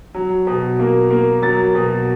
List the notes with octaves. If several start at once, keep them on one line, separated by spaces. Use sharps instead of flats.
F#3
B2
A#3
A#3
F#3 A6
B2